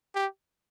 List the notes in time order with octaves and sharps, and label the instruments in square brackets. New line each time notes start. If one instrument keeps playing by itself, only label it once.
[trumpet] G4